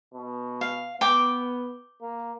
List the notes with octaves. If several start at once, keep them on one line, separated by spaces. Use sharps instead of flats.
B2
F5
B3 G5 D6
A#3